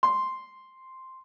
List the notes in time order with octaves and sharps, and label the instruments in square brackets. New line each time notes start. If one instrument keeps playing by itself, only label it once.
[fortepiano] C6